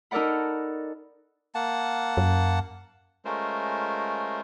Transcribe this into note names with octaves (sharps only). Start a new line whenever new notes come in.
D#4 A4 A#4 D5 F#5 B5
A#3 F#5 A5
F#2
G#3 A3 C#4 F4 A#4 C5